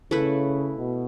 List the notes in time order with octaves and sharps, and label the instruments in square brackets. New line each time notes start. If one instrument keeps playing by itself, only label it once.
[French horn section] C#3 [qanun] A3 E4 B4
[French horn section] B2